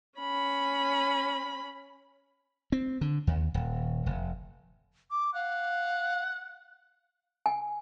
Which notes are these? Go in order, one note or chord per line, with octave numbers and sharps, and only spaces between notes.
C#4 B5
C4
D3
D#2
D#1
F1
D6
F5 F#5
G#5